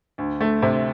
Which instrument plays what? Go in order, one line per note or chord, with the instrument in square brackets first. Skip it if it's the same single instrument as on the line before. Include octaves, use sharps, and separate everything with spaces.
[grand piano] D2
A3
C3